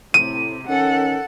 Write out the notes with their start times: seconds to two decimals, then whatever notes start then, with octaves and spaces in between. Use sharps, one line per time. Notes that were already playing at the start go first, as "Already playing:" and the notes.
0.14 A2 C3 C4 D#7
0.67 D#3 C#4 A4 F#5